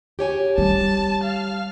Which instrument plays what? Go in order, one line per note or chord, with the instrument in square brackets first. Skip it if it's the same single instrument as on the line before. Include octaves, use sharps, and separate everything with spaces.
[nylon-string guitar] G4 C#5 G#5
[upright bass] G3 [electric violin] A5
[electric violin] F5